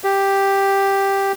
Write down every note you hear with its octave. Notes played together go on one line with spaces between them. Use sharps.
G4